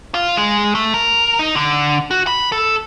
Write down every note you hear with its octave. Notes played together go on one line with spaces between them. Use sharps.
F4
G#3
A3
A#4
D#4
D3
F#4
B5
A4